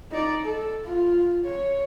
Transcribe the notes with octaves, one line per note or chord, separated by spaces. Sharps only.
D#4 D5
A4
F4
C#5